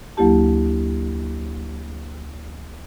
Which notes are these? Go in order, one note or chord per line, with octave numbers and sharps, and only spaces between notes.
D2 F#3 A#3 E4 G4 A5